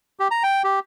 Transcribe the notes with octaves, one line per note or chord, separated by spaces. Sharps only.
G4
A#5
G5
G4